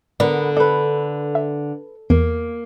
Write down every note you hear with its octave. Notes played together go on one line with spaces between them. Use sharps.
D3 B3 A#4 B4 D5
A4 B4 D5
E5
E2 A#3